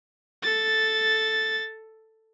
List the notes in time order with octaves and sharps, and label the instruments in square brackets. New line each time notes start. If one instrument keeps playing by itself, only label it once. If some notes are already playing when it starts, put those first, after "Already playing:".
[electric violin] A4 A6